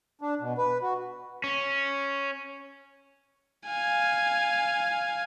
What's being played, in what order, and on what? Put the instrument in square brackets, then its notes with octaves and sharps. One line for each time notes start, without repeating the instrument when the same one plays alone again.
[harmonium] D4
B2
B4
F#4
[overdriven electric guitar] C#4
[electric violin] F5 G#5